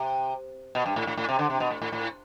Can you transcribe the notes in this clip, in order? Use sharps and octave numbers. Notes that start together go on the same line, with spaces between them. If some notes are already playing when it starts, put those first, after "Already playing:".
Already playing: C3
B2
G2
A2
A2
A2
C3
D3
C3
B2
A2
A2
A2